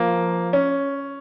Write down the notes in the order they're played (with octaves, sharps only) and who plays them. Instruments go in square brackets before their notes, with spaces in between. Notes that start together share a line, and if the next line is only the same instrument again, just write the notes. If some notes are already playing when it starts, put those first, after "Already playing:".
Already playing: [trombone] F3 [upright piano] A#3
[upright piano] C#4